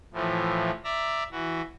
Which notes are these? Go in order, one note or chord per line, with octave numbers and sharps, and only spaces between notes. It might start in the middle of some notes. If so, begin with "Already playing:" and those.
A2 E3 F3
D5 E5 A#5
E3 F#4